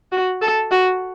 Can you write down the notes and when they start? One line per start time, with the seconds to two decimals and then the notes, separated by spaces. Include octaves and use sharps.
0.12 F#4
0.42 A4
0.71 F#4